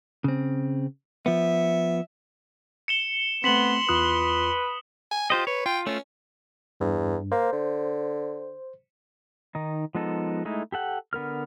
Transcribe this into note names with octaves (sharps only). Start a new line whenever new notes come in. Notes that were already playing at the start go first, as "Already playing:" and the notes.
C#3 C4
F3 B3 E5
C#7 E7 G7
A3 B3 C4 C6 B6 F#7 G7
E2 F4 B4 D#6 F#6
G#5
F4 G4 C5 D#5
B4 C#5
F4 G5
A3 C#4 F4
E2 G2
A#3 C5
D3
D#3 D#4
F3 G#3 B3 D#4 A4
G#3 A3 D#4 E4
G4 A4 F#5 G5
D3 B3 A#4 F6